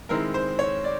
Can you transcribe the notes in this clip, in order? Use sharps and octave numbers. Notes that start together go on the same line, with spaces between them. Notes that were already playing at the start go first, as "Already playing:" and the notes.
D#3 G#3 C4 E4 A#4
C5
C#5
D5